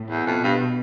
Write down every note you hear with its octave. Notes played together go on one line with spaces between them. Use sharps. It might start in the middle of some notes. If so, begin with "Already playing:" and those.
Already playing: A2
E2
F2 B2
G2